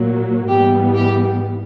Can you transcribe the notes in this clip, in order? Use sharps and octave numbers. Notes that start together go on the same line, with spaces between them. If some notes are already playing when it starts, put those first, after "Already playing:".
Already playing: A#2 F#3 A#3
G#2 E3 G3 B3 G4
G4